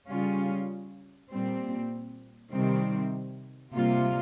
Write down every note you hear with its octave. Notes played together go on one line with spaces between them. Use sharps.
C#3 G3 C#4 F4
A#2 G3 C4
C3 D#3 G3 C4
C3 G3 A#3 F4